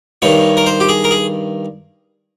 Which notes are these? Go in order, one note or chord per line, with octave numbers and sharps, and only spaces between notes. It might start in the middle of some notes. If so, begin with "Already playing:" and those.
G2 D#3 C#5
A#4
C5
G4
G#4
A#4
G#4